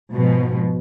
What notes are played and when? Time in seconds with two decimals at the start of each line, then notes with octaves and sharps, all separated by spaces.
0.12 G#2 B2 F3 G#3